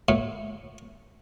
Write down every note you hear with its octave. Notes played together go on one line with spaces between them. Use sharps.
A2